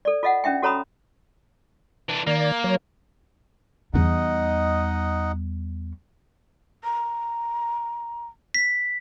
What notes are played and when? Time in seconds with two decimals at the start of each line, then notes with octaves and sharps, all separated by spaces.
0.05 A4 D5
0.23 F4 A4 D#5 F5 F#5
0.44 C#4 D4 E5 G5
0.62 F#4 A4 C#5 A#5 B5 D#6
2.09 E3 D4
2.27 D#3 A#3 D5
2.64 F#3 C#5
3.94 E2 G3 D#4 D#5 F#5
6.84 A#5
8.54 B6